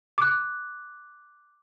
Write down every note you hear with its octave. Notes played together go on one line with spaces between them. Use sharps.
D6 F#6